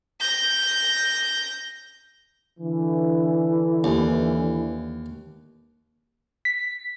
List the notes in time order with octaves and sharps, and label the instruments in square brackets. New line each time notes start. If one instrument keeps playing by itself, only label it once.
[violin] G6 A#6
[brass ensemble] D3 E3
[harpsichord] D#2
[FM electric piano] B6